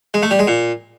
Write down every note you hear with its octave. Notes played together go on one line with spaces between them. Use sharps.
G#3
A3
G3
G#3
A#2